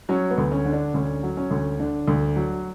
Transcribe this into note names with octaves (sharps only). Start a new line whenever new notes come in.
F#3 C#4
B3
D2
C#4
D3
D4
D2 C#4
F#3
C#4
D2
D3 D4
D2
F#3